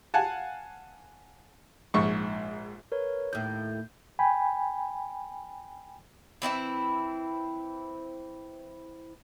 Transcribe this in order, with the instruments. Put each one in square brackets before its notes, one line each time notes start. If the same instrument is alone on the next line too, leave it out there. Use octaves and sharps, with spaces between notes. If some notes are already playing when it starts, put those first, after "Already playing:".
[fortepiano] F5 F#5 G#5 A5
A#1 G#2 C#6
[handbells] A#4 B4 C#5
[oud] D#2 A2 [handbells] G6
[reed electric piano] G5 G#5 B5
[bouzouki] E3 C4 E4 E5